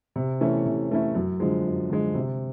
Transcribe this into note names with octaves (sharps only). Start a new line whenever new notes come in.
C3
E3 A3 C#4 E4
C3
E3 A3 C#4 E4
F#2
D3 F3 G#3
F#2
D3 F3 G#3
C3